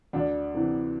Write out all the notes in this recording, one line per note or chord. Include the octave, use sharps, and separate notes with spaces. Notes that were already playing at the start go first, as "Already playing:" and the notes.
D2 D4
C3 E3